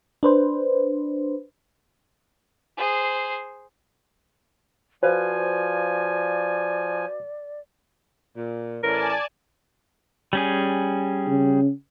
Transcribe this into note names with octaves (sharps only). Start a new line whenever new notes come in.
D4 B4 C5
G#4 C5
F3 F#4 B4 C5 D5 F5 G#5
A#2
A2 E3 C#4 A#4 D5 G#5 A5
G3 C#4 G#4
C#3